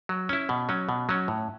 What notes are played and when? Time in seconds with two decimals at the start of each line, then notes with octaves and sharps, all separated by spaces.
0.09 F#3
0.29 C#4 E4
0.49 B2
0.69 F#3 C#4
0.89 B2
1.09 F#3 C#4
1.28 A2